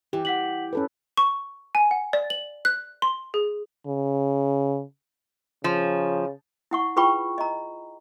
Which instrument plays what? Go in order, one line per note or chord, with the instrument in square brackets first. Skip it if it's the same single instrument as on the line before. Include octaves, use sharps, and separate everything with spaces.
[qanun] E3 [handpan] G4
[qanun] E3 [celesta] F#5 B6 F#7
[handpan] C#4 A4 B4
[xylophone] C#6
G#5
F#5
D5
F#7
F#6
C6
G#4
[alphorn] C#3
[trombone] C#3 [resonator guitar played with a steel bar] F3
[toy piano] E4 F#5 C#6
F4 G#4 B4 G5 B5 C#6
D#5 A#5